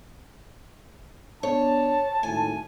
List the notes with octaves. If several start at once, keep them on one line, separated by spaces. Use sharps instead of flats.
B3 D4 C#5 A5
G#1 A2 G#5